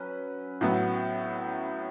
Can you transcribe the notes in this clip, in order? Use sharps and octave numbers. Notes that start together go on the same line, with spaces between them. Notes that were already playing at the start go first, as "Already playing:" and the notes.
Already playing: F#3 C#4 B4
A2 F#3 B3